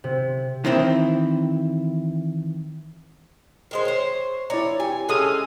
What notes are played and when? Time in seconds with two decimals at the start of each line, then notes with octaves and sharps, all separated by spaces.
0.04 C3
0.65 D#3 E3 C4 E4
3.71 D#3 G#3 C5
3.85 C5 C#5
4.50 E4 C#5 D5 A#5
4.80 G4 G#5
5.09 G#3 C#4 A4 F5 D#6